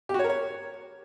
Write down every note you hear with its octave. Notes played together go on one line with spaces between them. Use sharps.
G4
F#4
C#5
A#4
C#5